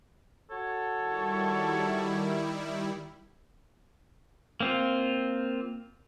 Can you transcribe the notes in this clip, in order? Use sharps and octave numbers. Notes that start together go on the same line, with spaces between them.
F#4 A4 C#5
D#3 G3 E4
A#3 C4 F4